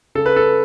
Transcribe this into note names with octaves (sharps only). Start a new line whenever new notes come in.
C#3 A4
B4
A4